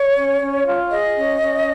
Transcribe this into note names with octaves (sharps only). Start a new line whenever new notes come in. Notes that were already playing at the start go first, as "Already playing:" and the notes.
Already playing: C#5
C#4
C#4
F4
G#4 D#5
C#4
C#4